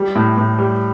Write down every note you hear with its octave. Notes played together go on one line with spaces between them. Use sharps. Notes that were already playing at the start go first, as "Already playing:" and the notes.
Already playing: G3
A2
A2
G3